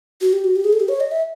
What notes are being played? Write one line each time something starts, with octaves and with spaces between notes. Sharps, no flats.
F#4
G4
F#4
G4
G#4
A4
G4
C#5
D#5
E5